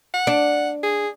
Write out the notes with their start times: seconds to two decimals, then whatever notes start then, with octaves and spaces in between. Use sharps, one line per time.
0.14 F#5
0.27 D4
0.83 G#4